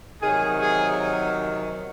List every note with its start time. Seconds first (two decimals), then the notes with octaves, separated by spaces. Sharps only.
0.22 C3 D#3 F#3 G#4
0.61 G#4